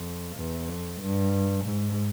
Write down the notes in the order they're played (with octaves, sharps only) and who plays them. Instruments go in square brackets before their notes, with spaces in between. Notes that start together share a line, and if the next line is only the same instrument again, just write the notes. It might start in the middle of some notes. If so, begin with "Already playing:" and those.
Already playing: [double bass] F2
E2
F2
G2
G#2